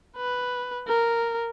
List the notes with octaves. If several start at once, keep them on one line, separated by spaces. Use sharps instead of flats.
B4
A#4